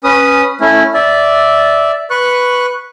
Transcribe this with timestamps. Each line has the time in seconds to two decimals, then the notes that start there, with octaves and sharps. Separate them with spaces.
0.04 C#4 B4 D#6
0.60 A3 C#4 E4
0.94 D5 E5
2.10 B4 C#6 F#6